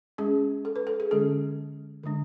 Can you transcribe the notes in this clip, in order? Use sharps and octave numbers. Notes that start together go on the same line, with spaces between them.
G#3 C#4 G#4
A4
B4
A4
G#4
D3 G#3 C#4 A4
D3 G#3 D4